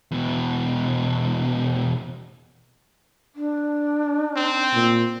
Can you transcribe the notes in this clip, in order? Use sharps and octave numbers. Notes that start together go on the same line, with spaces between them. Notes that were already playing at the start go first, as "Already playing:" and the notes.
E2 B2
D4
C4
A#2